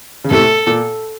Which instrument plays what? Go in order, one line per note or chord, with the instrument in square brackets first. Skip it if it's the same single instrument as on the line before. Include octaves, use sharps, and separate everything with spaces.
[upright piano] C#3
[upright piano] A2 C3 [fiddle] A4
[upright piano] A#2